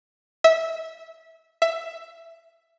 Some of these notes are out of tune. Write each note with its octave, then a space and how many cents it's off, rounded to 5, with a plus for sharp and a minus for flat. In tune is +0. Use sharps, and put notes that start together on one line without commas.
E5 -20
E5 +10